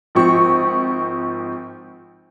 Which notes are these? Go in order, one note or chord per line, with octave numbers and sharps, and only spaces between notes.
G#1 F3 C4 C#6